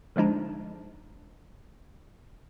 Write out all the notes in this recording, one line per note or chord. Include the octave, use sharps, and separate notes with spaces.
D3 F3 G#3 D4 D#4